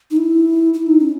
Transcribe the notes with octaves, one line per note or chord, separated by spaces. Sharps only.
D#4
E4
E4
D#4
C#4